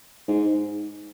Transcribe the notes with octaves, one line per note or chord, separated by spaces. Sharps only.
G#2